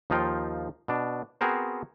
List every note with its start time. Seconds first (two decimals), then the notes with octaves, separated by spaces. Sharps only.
0.10 D#2 F3 D#4 F4 G5
0.88 B2 D4
1.41 B3 C4 F#4 G#4 A#4 C5